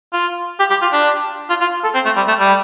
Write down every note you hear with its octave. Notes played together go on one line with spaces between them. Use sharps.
F4
G4
G4
F4
D4
F4
F4
A4
C4
A3
G3
A3
G3